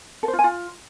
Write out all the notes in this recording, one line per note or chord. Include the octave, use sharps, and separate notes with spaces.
A4
C5
F4
G#5
F4